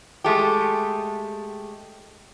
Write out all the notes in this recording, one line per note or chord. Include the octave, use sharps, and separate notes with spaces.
G#3 A3 G4